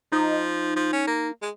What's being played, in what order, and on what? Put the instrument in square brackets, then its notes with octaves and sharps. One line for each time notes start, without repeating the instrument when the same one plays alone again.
[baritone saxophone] F3 [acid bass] D#4
[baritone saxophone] F3
C#4
A#3
G#3